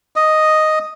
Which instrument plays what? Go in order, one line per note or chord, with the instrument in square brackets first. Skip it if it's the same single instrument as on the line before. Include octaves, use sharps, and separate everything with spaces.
[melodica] D#5